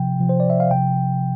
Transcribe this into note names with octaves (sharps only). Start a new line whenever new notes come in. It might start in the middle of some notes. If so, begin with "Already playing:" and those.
Already playing: C3 F3 G5
C3 F3
C5
D5
E5
F5
C3 F3 G5